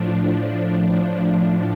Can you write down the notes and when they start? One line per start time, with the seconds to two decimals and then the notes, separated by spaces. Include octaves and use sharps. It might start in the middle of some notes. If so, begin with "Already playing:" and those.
Already playing: A2 F3 D4